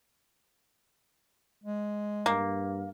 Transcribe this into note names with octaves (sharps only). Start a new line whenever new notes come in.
G#3
G2 A#3